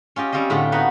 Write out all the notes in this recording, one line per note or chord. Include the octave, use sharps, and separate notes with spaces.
C#4 F4 G4 D#5
G3 C4 C#4 F4 C5 D#5
A2 D3 A3 F4 G4
B3 D#4 F#4 B4